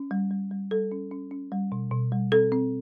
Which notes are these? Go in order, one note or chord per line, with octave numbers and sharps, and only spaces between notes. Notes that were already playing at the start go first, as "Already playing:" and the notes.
Already playing: C#4
G3
G3
G3
G3 A4
C#4
C#4
C#4
G3
B2
B2
G3
C4 A4
C4